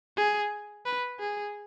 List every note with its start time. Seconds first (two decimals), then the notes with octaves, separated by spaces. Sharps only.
0.17 G#4
0.86 B4
1.20 G#4